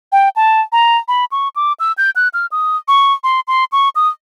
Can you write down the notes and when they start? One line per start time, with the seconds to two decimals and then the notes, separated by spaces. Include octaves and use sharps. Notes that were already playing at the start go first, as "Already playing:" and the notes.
0.12 G5
0.36 A5
0.72 A#5
1.08 B5
1.32 C#6
1.56 D6
1.80 E6
1.98 G6
2.16 F#6
2.34 F6
2.52 D#6
2.88 C#6
3.24 C6
3.48 C6
3.72 C#6
3.96 D#6